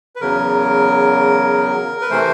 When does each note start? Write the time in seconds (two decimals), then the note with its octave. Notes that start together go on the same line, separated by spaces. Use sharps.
0.16 B4
0.21 E2 C#3 F#3 A#4
2.01 B4
2.10 C3 E3 A3 C5